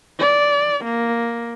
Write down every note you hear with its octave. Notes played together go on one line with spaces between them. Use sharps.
D5
A#3